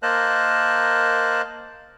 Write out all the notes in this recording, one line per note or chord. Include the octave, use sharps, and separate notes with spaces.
A#3 A#4 C5 D#5 A5 F#6